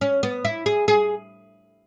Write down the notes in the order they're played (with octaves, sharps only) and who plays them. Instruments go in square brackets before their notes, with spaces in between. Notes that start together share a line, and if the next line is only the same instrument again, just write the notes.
[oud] C#4
B3
E4
G#4
G#4